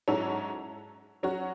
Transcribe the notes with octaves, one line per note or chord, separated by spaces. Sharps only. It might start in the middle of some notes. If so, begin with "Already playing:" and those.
G#2 F#3 C#4 E4 A4
F#3 C#4 F#4